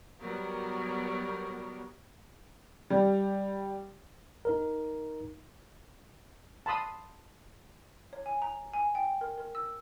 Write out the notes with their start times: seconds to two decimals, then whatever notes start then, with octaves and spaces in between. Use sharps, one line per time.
0.20 F#3 G3 B3 A#4
2.90 G3
4.45 D#4 A#4
6.66 A5 B5 C6 D#6
8.13 C#5
8.26 G#5
8.42 A#5
8.74 G#5
8.95 G5
9.21 A#4
9.38 A#4
9.55 E6